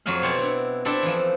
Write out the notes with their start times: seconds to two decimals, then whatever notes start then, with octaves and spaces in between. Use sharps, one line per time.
0.06 F2 F#3 F#4 G#4 F5
0.22 B2 C4 C#5 D5 F#5 A5
0.38 D4 E4
0.85 C4 D4 E4 A4 D5 E5
1.03 E3 F3